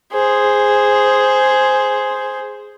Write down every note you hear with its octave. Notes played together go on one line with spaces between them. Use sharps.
G#4 C5